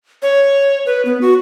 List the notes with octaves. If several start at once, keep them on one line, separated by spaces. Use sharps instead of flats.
C#5
B4
B3
F#4